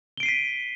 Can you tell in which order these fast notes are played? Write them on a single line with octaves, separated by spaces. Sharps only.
G7 D7 C7 D#7 B6